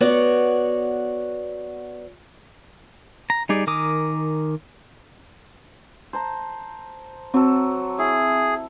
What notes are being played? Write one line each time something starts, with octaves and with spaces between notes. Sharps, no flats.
B3 F#4 C#5 D5
A#5
G3 D#4 G#4 D5
D#3 A#4 G#5 D6 D#6
C5 A5 A#5
F#3 C4 A4
E4 G#4